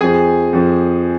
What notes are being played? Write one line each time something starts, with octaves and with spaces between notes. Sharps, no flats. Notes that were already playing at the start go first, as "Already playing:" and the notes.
F2 F3 G#4 G#5
F2 F3